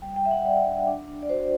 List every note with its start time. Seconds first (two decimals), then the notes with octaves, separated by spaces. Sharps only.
0.02 G3 G5
0.16 G5
0.23 G3 E5
0.31 F#5
0.45 G3 D5
0.66 D4
0.88 D4
1.08 D4
1.23 D5
1.29 F#4 C5